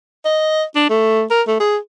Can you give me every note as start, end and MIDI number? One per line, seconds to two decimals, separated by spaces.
0.25 0.63 75
0.75 0.88 62
0.90 1.24 57
1.30 1.42 70
1.47 1.57 57
1.60 1.77 68